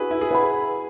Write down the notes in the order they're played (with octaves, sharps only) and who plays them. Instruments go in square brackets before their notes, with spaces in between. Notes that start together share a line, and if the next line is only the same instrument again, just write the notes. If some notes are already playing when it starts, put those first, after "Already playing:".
Already playing: [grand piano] E4 F#4 G#4 B4
E4
G#4
[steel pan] B4 F#5 B5